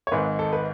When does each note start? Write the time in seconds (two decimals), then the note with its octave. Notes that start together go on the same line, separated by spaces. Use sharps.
0.07 C#5
0.12 G#1 G#2 D#3 G#3 B4
0.39 A4
0.53 B4